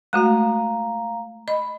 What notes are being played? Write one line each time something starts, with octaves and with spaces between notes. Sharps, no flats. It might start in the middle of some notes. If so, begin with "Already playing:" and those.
G#3 A3 F#4 F5 A#5
D#5 B5